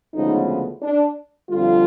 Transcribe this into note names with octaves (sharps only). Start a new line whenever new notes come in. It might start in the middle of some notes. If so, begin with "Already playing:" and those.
D2 C#3 F3 G#3 B3 D#4
D4
F2 D3 G3 F4